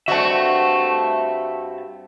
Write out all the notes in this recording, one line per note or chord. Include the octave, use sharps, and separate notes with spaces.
G2 C4 F#4 E5 A5